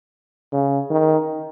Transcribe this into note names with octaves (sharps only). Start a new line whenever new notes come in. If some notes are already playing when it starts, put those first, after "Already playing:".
C#3
D#3